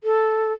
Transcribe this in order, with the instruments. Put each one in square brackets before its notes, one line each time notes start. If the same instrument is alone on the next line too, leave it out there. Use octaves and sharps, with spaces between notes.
[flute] A4